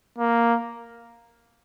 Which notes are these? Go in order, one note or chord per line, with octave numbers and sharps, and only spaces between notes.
A#3